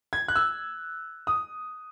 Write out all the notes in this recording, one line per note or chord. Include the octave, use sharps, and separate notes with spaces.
G#6
F#6
E6
D#6